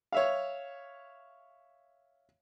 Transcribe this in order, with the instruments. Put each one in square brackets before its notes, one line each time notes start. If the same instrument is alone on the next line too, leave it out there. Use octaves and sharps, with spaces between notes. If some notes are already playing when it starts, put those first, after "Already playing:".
[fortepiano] C#5 E5 F5